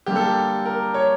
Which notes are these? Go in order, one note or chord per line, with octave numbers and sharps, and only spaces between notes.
D3 G3 A#3 G4
A4
G4
A#4
C#5